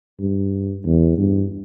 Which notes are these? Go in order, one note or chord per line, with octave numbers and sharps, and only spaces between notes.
G2
E2
G2